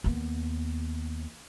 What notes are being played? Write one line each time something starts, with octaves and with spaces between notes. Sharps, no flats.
D#2 B3